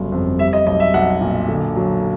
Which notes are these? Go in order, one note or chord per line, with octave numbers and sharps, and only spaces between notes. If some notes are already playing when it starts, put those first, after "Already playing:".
Already playing: G1 C#3 F#3
F2
G3 E5
D#5
B1 D#5
E5
B1 F#5
A#2
D3
F#3